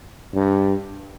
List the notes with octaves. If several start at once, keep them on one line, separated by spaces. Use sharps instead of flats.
G2